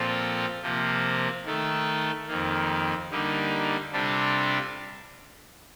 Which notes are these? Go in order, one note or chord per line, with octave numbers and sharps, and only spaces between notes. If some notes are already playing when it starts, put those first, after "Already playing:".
Already playing: A#2 F3 C4 F4 A4
C3 F3 A#3
D#3 A3 D#4 A4
F2 D#3 A#3
D3 G3 A#3 D#4
C3 G3 D4 F4 A4